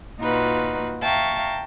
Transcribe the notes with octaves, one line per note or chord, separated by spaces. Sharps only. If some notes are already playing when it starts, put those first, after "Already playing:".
A#2 D#4 F4 F#4 B4
E5 F5 G5 A5 A#5 C#6